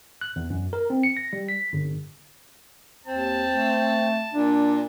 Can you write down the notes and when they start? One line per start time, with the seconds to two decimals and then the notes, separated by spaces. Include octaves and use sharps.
0.21 F#6
0.36 E2
0.50 F#2
0.73 A#4
0.90 C4
1.03 C#7
1.17 A#6
1.33 G3
1.49 B6
1.73 G1
3.07 D#2 C4 A5
3.52 A3
4.33 A#2 D4